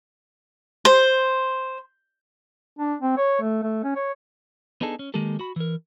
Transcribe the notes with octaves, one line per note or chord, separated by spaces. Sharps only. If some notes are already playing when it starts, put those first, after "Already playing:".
C5
D4
C4
C#5
A3
A3
C#4
C#5
B3 D4 D#4 G#4 A4
C#4
D#3 G#3 A#3 G4 A4
F#4 B5
E3 A#4